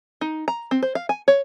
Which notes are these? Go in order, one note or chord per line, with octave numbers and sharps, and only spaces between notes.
D#4
A#5
C4
C5
F5
G#5
C#5